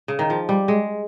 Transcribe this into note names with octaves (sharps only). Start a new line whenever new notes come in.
C#3
D#3
F3
G3
G#3